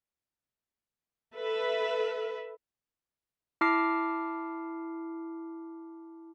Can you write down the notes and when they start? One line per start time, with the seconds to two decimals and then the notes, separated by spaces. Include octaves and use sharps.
1.35 A4 B4 E5
3.61 E4 A5 D6 F6 C7